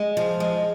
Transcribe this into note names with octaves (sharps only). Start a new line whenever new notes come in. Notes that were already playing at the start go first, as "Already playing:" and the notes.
Already playing: G#3
F3
G#3